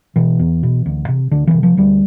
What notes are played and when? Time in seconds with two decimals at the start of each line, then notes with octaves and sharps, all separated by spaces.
0.16 B2 E3
0.39 E2
0.63 B2
0.86 D2
1.09 C3
1.31 D2 D3
1.47 E3
1.54 C3
1.63 F3
1.77 D2 G3